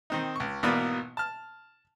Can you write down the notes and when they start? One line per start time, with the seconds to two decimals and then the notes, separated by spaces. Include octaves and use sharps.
0.10 D#3 C4 D#4
0.36 C#2 C#6
0.63 G#1 B2 E3 A#3 B3 D5
1.17 A5 F6